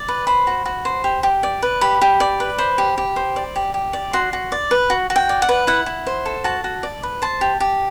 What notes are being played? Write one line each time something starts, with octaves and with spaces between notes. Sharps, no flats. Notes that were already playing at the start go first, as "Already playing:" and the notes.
Already playing: D5
B4
C5 B5
F#4
F#4
C5
G4
G4
D5
B4
G4 B5
G4
D5
B4
C5 B5
G4
G4
C5
D5
G4
G4
D5
F#4 C6
F#4
D5
B4
F#4
F#4
G5
D5
F#5
B4
E4 F#5
E4
C5
A4
F#4 A5
F#4
D5
B4
C5 A5
G4
G4